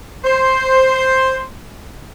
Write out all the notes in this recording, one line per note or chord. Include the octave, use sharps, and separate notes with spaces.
C5